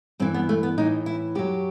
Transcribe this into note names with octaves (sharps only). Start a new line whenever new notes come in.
G2 E3 C4
B3
A3
B3
A2 E3 D#4
E4
F#2 F#3 G4